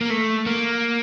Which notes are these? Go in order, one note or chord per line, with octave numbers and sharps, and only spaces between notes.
A#3
A3
A#3